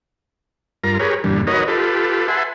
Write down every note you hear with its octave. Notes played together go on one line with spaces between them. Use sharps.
G2 F4 A#4 A#5
G4 G#4 A#4 B4 C#5
E2 G2 A#2 D3 G3
D#4 F#4 A#4 B4 C#5 D#5
F4 G4 A4 B4
B4 E5 F#5 G#5 A5 C6